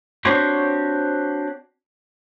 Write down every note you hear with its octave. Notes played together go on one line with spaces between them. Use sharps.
C4 D4 F#4 G4 C5 C#5